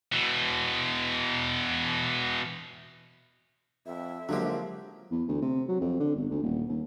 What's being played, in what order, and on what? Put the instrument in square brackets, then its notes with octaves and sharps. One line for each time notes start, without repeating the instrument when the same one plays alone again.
[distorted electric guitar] B2 E3
[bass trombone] F2 [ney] E5
[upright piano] D3 G#3 A#3 [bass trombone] F3 [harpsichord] F#3 G4
[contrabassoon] E2
D2
C3
F#3
F2
D3
G1
D2
D#1
D#2